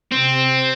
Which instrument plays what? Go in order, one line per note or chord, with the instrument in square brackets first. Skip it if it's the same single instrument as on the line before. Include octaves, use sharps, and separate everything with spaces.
[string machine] C3 [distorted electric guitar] C4